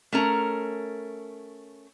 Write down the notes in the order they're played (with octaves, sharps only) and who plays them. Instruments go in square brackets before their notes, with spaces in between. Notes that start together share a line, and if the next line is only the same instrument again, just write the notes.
[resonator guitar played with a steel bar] A3 C#4 A#4